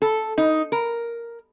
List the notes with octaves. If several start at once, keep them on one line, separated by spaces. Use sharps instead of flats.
A4
D#4
A#4